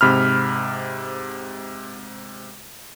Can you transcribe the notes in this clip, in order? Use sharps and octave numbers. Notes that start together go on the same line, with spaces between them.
G#2 C3 B5 F6